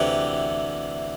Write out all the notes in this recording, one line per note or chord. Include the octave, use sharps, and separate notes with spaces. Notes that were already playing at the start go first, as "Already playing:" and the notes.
Already playing: D2 C3 E3 G4